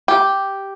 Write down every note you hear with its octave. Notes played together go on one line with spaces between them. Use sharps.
G4